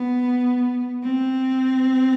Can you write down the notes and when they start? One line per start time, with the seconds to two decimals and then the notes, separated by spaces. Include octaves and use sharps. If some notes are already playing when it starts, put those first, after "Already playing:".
Already playing: B3
1.03 C4